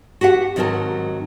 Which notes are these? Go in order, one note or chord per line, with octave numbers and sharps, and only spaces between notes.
F#4 G4 E5 F#5
G#2 D#3 F#3 C4 A#4 A5